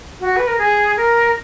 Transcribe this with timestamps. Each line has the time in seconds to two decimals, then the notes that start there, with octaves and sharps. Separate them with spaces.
0.21 F#4
0.37 B4
0.47 A#4
0.58 G#4
0.97 A#4